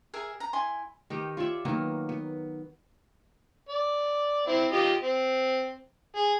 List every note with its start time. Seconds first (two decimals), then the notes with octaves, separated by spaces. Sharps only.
0.14 G#4 A#4 E5 G#5
0.40 A#5
0.53 E4 G#5 C6
1.10 D#3 D#4 G4 A#5
1.37 F4 C#5 D5 E5
1.65 D#3 F#3 A#3 B3
2.09 B3
3.69 D5
4.47 C4 E4
4.72 F4 G4 D#5
5.02 C4
6.16 G#4